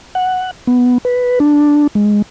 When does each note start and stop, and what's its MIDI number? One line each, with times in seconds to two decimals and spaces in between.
0.15 0.51 78
0.67 0.98 59
1.05 1.39 71
1.40 1.87 62
1.95 2.22 56